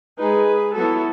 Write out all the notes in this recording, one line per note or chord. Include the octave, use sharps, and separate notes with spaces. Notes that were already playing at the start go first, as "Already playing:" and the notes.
G#3 D#4 G#4 B4
F#3 B3 E4 F#4 A4